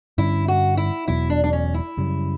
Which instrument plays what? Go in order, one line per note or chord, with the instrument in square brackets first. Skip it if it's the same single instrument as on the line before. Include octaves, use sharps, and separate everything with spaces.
[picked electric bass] G2 D3 G3 C#4 [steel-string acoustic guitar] E4
[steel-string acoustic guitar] F#4
E4
[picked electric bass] E1 E2 B2 F#3 [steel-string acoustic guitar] E4
[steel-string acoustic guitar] D4
D4
C#4
E4
[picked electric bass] F#2 C#3 G3